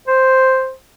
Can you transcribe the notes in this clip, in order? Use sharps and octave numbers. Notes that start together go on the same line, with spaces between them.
C5